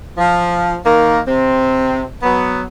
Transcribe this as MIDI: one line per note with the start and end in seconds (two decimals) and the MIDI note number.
0.18 0.75 53
0.85 1.19 51
0.85 1.19 58
1.27 2.05 48
1.27 2.05 60
2.23 2.62 54
2.23 2.62 59